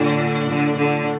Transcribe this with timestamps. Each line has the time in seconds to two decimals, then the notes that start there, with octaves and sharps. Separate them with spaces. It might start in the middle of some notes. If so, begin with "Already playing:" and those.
Already playing: A2 D3
0.50 D3
0.77 D3